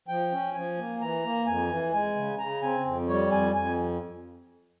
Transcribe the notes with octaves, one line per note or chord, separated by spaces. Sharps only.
F3 G5
C#4
F3 G#5
A#3
E3 A#5
A#3
F2 G#5
E3
G#3 G#5
C#3
C#3 A#5
C4 G#5
F2
G3 C#5
F2 G#5
F2 G#5